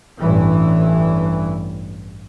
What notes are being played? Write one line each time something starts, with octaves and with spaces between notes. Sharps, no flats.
A1 G2 E3